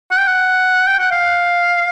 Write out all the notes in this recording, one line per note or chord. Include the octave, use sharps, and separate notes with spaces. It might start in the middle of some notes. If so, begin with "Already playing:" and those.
F#5
G5
F#5
G5
F#5
F5